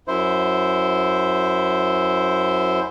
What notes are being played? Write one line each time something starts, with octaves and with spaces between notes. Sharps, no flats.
F#2 E4 C5